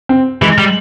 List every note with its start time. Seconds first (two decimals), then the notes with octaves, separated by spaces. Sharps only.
0.09 C4
0.42 E3 G#3
0.58 G3